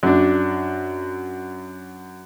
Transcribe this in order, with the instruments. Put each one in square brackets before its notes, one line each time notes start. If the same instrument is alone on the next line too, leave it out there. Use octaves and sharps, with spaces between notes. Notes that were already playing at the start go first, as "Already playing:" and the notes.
[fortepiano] F#2 D4